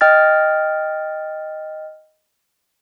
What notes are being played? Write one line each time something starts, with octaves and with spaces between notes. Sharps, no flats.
D#5 G5 F6 A6